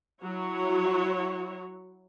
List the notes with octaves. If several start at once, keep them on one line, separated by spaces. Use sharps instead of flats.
F#3 E4 F#4 C#5